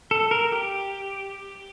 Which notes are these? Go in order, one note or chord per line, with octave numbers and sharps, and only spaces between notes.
A4
A#4
G4